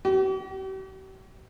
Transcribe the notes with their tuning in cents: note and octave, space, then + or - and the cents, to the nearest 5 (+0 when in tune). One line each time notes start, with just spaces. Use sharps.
G4 -45